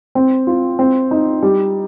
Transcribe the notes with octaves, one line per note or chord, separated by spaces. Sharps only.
C4
F4
C4
D#4
G3